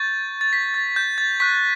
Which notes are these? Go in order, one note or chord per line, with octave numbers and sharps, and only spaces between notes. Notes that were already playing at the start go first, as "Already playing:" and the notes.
Already playing: C#6 G6 A6
A6
B6
A6
G6
A6
C#6 F#6 B6